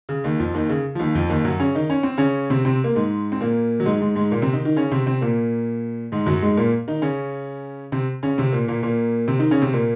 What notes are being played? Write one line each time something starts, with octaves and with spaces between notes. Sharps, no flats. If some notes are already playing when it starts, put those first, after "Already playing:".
C#3
D#2 D#3
F2 F3
D#2 D#3
C#3
F3
D#2 D#3
F2 F3
D#2 D#3
F#2 F#3
C#3 C#4
D#3 D#4
C#4
C4
C#3 C#4
C3 C4
C3 C4
A#3
G#2 G#3
C4
A#2 A#3
F#3
G#2 G#3
G#2 G#3
G#2 G#3
A#2 A#3
C3 C4
D#3 D#4
D#3 D#4
C#3 C#4
C3 C4
C3 C4
A#2 A#3
G#2 G#3
F#2 F#3
G#2 G#3
A#2 A#3
D#3 D#4
C#3 C#4
C3 C4
C#3 C#4
C3 C4
A#2 A#3
A#2 A#3
A#2 A#3
C3 C4
D#3 D#4
C#3 C#4
C3 C4
A#2 A#3